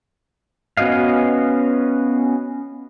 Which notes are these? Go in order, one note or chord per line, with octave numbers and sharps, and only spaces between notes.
B3 C#4 F#4 D#5 F5